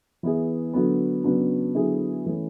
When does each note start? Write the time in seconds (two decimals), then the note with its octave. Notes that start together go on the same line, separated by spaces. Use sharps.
0.23 E3 B3 E4 G#4
0.73 D3 F#3 B3
1.24 C#3 F#3 B3 D4
1.75 D3 F#3 B3 E4 G#4
2.26 E3 A3 C#4